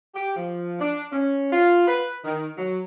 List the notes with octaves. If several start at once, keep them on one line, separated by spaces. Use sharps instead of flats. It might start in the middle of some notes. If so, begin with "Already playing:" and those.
G4
F3
D4
C#4
F4
B4
D#3
F#3